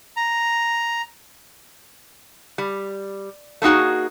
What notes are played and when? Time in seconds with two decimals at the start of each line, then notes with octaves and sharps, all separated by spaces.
0.17 A#5
2.58 G3
3.62 A3 A#3 D#4 F#4 G#4